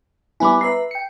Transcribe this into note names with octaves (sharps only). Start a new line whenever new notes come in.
G3 B3 E4 G#5 B5 D6
B4 E5 A#5 C7
G5 C#7